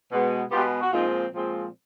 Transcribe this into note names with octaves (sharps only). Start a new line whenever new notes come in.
B2 G#3 B3
B2 G#3 B3 F4 G4
F#4
A#2 F3 G#3 C4 D#4 F4
A#2 F3 G#3 C4